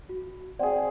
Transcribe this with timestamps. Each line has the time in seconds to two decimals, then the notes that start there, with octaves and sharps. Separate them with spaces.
0.09 F#4
0.59 C4 G#4 D5 F#5